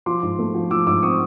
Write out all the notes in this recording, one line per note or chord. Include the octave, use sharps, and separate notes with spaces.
F3 C6 D6
G#2
A3
F3
F3 D6 E6
G#2 D6 E6
C4 C#6 D#6